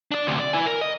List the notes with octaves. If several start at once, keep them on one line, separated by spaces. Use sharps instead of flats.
D4 D5
D2 C3
D5
E4 G#5
A#4
D#5